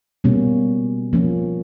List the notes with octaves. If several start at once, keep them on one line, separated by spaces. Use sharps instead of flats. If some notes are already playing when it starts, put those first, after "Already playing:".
B2 G3 A#3 C#4
F3 A#3 C#4